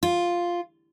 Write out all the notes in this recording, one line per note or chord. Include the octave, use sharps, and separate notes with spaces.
F4